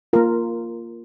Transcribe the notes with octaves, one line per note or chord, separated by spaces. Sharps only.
A#3 F4 A#4